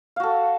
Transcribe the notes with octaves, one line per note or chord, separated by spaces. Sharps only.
F#4 A4 F5